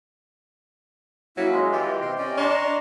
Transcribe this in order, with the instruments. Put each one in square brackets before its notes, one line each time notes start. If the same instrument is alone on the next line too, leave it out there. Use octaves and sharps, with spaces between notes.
[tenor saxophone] F#3 [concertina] A#3 C#4 E5 [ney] E4
[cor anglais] G#3 [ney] D#5
[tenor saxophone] E3 [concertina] F4 [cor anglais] G4
[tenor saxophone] C3 [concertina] G5 C6
[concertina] C#4 D5 G5 [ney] D#5
[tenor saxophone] D4 [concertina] A#5 C6 C#6